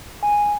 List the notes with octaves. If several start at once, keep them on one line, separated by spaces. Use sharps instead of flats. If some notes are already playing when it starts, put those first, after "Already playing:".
G#5